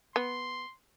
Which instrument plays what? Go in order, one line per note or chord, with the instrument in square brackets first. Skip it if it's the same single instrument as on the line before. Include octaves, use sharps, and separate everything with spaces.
[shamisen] B3 [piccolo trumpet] C6